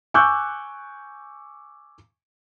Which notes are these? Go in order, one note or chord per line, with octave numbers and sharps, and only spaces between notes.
G#5 C#6 D6 E6 F#6 G6